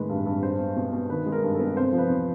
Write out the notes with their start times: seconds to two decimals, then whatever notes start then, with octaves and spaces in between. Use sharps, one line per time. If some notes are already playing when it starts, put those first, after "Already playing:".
Already playing: A2 D#3 G#3 B4
0.09 G2
0.26 G2
0.43 G#3 C5
0.59 B3
0.76 B2
0.92 B2
1.10 D#3 B4
1.26 G#3
1.32 A#4
1.43 G2
1.55 A4
1.60 B3
1.76 C3 C5
1.93 F3
1.98 B4
2.10 E2